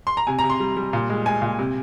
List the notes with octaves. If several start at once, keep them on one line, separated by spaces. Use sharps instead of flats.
C6
A#5
C3 G#5
A#5
C3
C6
G3
G3
A#2
G#3
G#3 G#5
A#2
C3